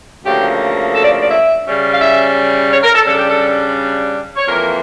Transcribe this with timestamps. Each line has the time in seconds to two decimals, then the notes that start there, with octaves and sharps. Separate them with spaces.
0.24 D2 C#3 F3 A#3 G4
0.95 A4
1.03 D5
1.21 D5
1.30 E5
1.66 C#3 G3 C#4
1.93 F5
2.01 E5
2.71 C#5
2.83 A#4
2.95 A4
3.07 C#3 G3 D4 A4
3.18 G4
3.30 A4
4.37 C#5
4.47 F2 E3 A#3 A#4